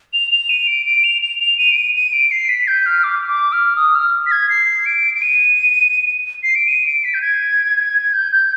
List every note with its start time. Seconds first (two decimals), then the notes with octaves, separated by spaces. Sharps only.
0.13 F7
0.31 F7
0.49 D#7
0.67 D7
0.86 D7
1.04 F7
1.22 F7
1.40 F7
1.58 D#7
1.71 D7
1.77 D#7
1.95 D#7
2.13 D7
2.31 C7
2.49 B6
2.68 G6
2.86 F6
3.04 D6
3.28 D6
3.53 F6
3.76 D#6
3.95 F6
4.26 B6
4.32 G#6
4.49 C7
4.86 D7
5.15 D7
5.22 D#7
6.43 C7
6.55 D7
6.67 D#7
6.86 D7
7.04 B6
7.14 G6
7.22 G#6
8.13 G6
8.32 G6